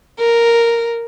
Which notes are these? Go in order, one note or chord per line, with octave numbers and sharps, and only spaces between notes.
A#4